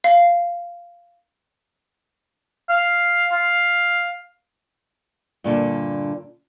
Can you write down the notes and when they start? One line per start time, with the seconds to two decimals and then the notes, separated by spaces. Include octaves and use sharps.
0.04 F5
2.70 F5
3.33 F5
5.44 G2 A#2 D3 A4